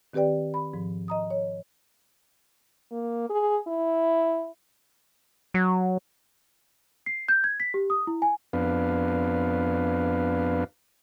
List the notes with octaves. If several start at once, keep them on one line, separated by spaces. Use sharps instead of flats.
D#3 C4 G4 B4 D5 G5
B5
G#2 F3
D#5 A#5 D#6
C#5
A#3
G#4
E4
F#3
C7
G6
G#6
B6
G4
D#6
E4
G#5
F2 B3 D4 B4 F5